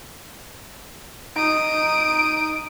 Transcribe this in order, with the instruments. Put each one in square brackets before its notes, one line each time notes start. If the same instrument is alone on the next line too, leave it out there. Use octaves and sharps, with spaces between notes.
[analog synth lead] D#4 [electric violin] D#6 D7